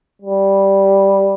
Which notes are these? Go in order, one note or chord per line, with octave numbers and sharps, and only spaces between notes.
G3